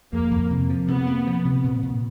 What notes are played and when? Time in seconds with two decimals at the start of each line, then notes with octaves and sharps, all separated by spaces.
0.13 F2 A#3
0.31 F2
0.51 C3
0.70 F3
0.88 C3 B3
1.07 A#3
1.27 F3
1.45 C3
1.64 A#2
1.83 A#2